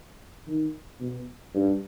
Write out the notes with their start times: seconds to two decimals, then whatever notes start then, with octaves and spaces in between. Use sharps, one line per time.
0.47 D#3
1.00 B2
1.54 G2